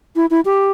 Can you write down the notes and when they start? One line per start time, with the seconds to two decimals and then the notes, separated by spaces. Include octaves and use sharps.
0.16 E4
0.31 E4
0.45 G4